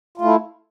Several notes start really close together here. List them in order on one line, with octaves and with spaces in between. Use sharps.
F4 A3 E4